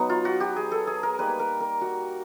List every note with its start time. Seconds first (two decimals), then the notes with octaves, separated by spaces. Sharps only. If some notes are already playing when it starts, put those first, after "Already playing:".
Already playing: F#3 B3 D#4
0.09 F4
0.25 F#4
0.40 G4
0.56 G#4
0.72 A4
0.87 G#4
1.03 A#4
1.18 G3 A#3 D#4 B4
1.39 A#4
1.60 A#4
1.81 F#4